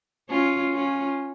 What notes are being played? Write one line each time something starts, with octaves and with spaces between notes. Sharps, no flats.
C#4 F4
C#4 F4